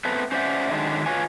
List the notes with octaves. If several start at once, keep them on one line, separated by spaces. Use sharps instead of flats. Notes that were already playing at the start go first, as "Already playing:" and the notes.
A3 B3 C4 A4 B4
C#4 C5 D5 E5 F#5
D3 D#3 F#3 G#3 D4
F4 B4 C#5 G#5